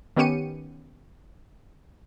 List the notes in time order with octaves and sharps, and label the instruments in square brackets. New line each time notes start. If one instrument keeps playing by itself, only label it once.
[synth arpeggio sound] D#3 B3 C#4 G4 C#7 D#7